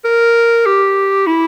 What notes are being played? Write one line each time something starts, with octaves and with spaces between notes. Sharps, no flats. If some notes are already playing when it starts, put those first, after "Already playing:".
A#4
G4
E4